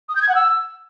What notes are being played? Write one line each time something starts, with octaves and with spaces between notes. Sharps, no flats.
D#6
G6
G#6
F#5
E6